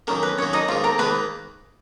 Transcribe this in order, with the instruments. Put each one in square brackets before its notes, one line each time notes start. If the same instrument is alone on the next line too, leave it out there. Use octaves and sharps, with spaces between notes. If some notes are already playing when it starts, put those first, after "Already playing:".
[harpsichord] F#2 D#3 A#3 [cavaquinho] A#4
[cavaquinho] B4
[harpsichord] F#2 D#3 A#3 [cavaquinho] C#5
[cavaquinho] D#4 D#5
[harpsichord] G#2 D#3 A#3 [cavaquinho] F4 F5
[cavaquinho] A#4 A#5
[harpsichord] G#2 D#3 A#3 [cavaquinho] B4 B5